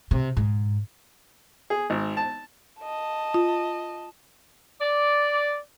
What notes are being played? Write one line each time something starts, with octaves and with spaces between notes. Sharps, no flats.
C3
G#2
G#4
G#1
A5
D#5 A5
F4
D5